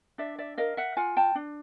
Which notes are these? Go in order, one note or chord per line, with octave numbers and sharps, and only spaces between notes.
D4 D5 E5
D5 E5
A#4 D#5 F5
E5 F#5
F4 F#5 G#5
G5 A5
D4